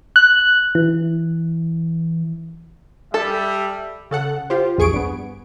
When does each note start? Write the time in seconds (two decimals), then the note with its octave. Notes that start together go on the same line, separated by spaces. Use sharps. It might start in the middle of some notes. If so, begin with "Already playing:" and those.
0.16 F#6
0.75 E3
3.14 G3 A4 E5
4.11 C#3 A4 F#5
4.50 F4 G4 C5
4.78 A#1 E2 G#4 C#6 D7
4.94 G2 B3